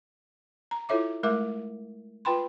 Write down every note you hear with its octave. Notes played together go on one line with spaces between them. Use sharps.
A#5
E4 F4 A4 C#5 E5 D6
G#3 A3 A#4 E5 D6
F4 B4 G5 B5 C6